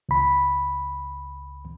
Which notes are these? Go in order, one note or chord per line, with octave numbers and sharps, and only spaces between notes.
C#2 B5